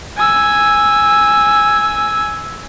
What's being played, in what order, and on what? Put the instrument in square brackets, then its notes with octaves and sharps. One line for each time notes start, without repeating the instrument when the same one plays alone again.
[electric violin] G#5 E6